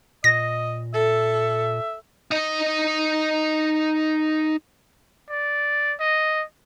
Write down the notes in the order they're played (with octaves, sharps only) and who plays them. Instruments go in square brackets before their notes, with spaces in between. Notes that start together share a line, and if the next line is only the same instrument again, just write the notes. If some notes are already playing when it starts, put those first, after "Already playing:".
[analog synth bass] A#2 [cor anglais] D#5 [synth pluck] A#6
[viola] A4 [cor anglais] E5
[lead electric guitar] D#4 D#5
[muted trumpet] D5
D#5